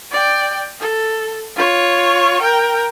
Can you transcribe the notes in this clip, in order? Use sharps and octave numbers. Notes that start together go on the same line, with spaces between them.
D5 G5
A4
F4 C#5
A#4 G5